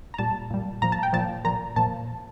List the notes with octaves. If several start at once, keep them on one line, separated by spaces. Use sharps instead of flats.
A#5
A#2 G3 A5
A#2 G3
A#2 F3 A#5
A5
G5
A#2 F3 A5
A#2 F3 A#5
A#2 F3 A5